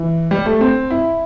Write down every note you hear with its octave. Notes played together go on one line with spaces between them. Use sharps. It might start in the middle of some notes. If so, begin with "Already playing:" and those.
Already playing: E3
G3
A3
C4
E4